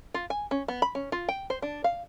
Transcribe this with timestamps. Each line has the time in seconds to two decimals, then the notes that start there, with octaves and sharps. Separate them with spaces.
0.14 F4
0.30 G#5
0.51 C#4
0.68 B3
0.82 B5
0.95 C#4
1.12 F4
1.29 G5
1.50 C5
1.62 D4
1.84 F5